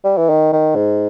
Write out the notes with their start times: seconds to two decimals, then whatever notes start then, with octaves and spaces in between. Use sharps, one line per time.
0.04 G3
0.18 E3
0.30 D#3
0.53 D#3
0.76 G#2